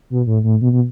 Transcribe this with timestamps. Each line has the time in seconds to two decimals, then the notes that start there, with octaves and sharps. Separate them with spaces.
0.10 B2
0.27 A2
0.44 A2
0.61 B2
0.72 B2